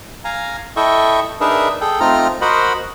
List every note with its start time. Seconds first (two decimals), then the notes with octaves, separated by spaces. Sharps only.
0.24 F5 G#5 A#5
0.76 E4 A4 D#5 E5 G5 C#6
1.41 D4 D#4 G#4 A#4 B4 E5
1.81 G#4 A4 G5
2.00 A3 C4 D#4 F4 A#5 F6
2.41 F#4 A#4 C5 D#5 F#5 B5